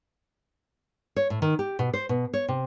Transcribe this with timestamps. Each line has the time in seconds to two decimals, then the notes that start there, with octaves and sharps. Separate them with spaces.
1.16 C#5
1.30 A2
1.42 D#3
1.59 G4
1.79 B2
1.94 C5
2.09 B2
2.34 C#5
2.48 C3